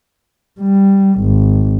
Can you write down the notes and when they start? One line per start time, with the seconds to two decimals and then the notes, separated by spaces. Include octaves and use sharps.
0.61 G3
1.20 G#1